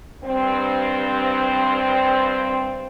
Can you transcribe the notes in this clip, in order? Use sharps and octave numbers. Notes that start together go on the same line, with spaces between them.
G2 C4